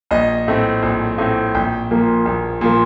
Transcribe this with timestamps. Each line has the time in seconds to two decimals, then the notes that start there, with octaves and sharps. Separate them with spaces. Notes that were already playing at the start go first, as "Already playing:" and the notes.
0.11 A#1 D#5
0.48 A2 A3 C4
0.83 A#1
1.18 A2 A3 C4
1.55 A#1 G5
1.91 A#2 F3 A#3
2.25 A#1
2.61 A#2 F3 A#3